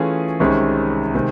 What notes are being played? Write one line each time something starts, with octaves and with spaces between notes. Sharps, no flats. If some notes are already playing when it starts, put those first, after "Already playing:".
Already playing: E3 A3 C#4 F4 G#4
C2 C3 D#3 G#3 C#4
C3 D#3 G#3